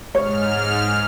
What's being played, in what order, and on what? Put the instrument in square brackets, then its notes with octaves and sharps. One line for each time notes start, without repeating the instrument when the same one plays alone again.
[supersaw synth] G#2 F6 [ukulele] C#5